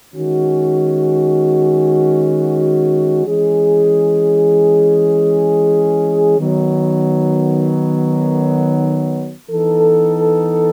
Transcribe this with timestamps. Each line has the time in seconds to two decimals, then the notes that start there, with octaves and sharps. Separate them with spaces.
0.15 D#3 G#3 C#4 F#4
3.26 E3 G#3 C#4 G#4
6.38 D#3 F#3 B3
9.50 E3 B3 D#4 A4